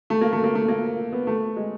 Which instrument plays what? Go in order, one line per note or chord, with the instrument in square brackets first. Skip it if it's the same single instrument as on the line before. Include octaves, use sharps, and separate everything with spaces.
[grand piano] A3
A#3
A3
A#3
A3
A#3
B3
A3
G#3